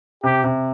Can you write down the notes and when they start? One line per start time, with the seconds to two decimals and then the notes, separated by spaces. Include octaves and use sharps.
0.23 C3 G4
0.44 C3